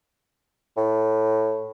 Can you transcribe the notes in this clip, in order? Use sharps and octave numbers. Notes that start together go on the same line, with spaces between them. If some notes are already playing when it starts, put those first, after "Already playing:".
A2